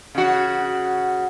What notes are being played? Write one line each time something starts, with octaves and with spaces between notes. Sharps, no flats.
C#3 F#4